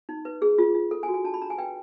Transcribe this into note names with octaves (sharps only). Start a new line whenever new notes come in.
D#4
B4
G#4
F4
F4
A4
G#5
F#4
G#5
D4 A5
B5
D4 A#5
G#5
B4 G5